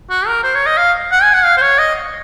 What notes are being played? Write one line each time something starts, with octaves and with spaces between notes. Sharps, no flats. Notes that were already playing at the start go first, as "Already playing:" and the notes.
F#4
A#4
C5
C#5
D#5
F5
F#5
G#5
F#5
F5
C5
C#5
D#5